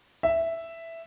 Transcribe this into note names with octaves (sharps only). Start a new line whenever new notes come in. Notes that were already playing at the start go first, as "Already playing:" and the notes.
E5